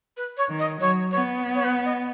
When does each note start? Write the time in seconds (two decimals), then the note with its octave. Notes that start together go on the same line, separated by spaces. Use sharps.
0.17 B4
0.37 C#5
0.49 D#3
0.59 D#5
0.80 F#3 C#5
1.11 B3 C#5
1.55 C#5
1.64 B4
1.85 D#5